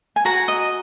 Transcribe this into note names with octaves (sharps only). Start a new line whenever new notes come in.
G#5
F#4 F#5 A#5
D#5